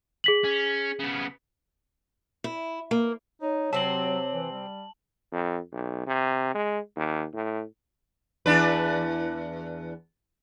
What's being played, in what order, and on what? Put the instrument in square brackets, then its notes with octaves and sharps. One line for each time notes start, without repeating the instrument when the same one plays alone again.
[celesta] G#4 B6 F#7
[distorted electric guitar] C#4
C#3 B3
[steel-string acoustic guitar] E4
A#3
[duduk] D#4 [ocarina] C#5
[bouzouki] C3 C4 [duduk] F#3 [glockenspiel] A5 F#7
[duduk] E3
G3
[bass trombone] F2
B1
C3
G#3
D#2
A2
[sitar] E2 D4 B4